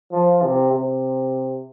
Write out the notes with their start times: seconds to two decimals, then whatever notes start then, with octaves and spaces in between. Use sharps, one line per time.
0.12 F3
0.42 C3
0.72 C3